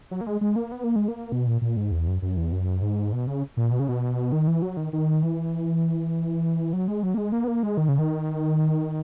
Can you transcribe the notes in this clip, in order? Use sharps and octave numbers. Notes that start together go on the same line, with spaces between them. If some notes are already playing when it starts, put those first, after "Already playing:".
F#3
A#3
G#3
G#3
A#3
B3
A#3
G#3
A#3
B2
A#2
A#2
G#2
E2
F#2
F#2
E2
F#2
G#2
B2
C#3
A#2
B2
C#3
B2
D#3
E3
F#3
D#3
D#3
E3
F#3
G#3
F#3
A#3
G#3
A#3
B3
A#3
G#3
D#3
C#3
D#3